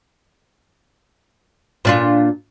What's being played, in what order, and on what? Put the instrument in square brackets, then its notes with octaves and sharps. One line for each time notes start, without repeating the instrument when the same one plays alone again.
[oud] A#2 D4 F4